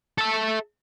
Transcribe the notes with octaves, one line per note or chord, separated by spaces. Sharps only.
A4 E5